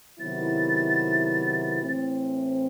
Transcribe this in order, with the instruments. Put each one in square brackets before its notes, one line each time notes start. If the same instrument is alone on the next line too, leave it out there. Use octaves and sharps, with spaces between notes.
[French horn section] C3 D#3 F#3 B3 E4 [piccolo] A6
[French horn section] A2 E3 A3 C4